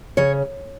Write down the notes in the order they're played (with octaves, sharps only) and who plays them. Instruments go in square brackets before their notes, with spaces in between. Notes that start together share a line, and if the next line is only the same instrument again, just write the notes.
[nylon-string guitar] C#3 C#5